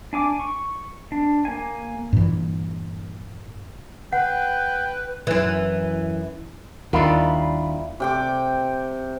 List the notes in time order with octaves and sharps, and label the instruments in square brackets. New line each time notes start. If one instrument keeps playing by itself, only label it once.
[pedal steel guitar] D4 G#5 D6
C#6
D4
A#3 G#5
[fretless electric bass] G2 A#2 E3
[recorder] B4 [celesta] F#5 [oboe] G5
[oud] F#2 E3
[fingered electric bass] D#2 [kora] D#3 G3 [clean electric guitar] D4 E4 F4
[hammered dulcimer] C3 G5 D6